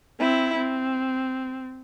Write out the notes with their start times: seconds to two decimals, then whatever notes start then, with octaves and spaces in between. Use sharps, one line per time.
0.19 C4 E4
0.57 C4